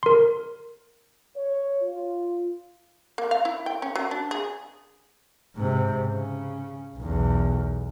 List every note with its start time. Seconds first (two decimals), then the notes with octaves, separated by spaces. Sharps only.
0.03 A#4 C6
1.36 C#5
1.82 F4
3.18 A#3
3.31 F5
3.45 E4
3.66 G5
3.82 C#4
3.95 F#3
4.11 D4
4.31 G#4
5.56 G#2 C3
6.07 C#3
6.97 B1 E2